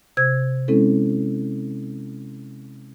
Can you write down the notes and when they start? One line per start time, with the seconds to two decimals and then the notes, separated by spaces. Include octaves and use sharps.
0.17 C3 C5 E6 G#6
0.68 G#3 C4 C#4 E4 A4